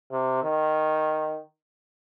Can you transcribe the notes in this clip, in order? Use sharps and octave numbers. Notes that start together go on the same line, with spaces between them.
C3
D#3